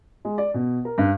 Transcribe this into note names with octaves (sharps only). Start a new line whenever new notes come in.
G#3
D5
B2
A#4
G2